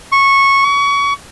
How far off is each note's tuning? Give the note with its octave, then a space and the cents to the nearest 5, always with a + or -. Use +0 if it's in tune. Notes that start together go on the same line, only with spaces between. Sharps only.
C#6 -10
C#6 +30